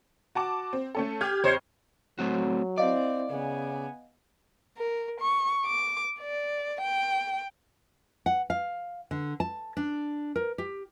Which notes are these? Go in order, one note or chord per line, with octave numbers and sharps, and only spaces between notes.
F#4 A5 D6
C4
A3 C#4 A4
G4 F6 G6 G#6
F2 C5 C#5 D#5 C7
F#3 A3 C4 F#4
C4 E4 D5 D#5 F5
C#3 B3 G#5
A#4
C#6
D6
D5
G5
F#5
F5
D3
A5
D4
A#4
G4